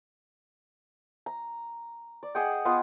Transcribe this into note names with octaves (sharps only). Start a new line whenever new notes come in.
A#5
D5
G#4 D#5 F#5 G5
B3 F4 D#5 D#6